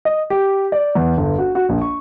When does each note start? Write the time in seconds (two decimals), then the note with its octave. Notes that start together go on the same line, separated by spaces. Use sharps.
0.05 D#5
0.30 G4
0.72 D5
0.95 E2
1.17 G1
1.38 F#4
1.55 F#4
1.69 A#1
1.81 C#6